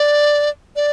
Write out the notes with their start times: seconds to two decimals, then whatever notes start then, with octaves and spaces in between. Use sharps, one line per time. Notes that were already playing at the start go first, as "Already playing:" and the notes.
Already playing: D5
0.76 D5